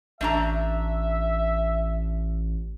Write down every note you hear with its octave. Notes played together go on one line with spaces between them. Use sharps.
A1 A3 D4 E5 A#5